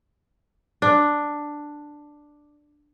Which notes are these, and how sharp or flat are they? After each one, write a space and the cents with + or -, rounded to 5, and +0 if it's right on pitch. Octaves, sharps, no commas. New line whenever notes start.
D4 +5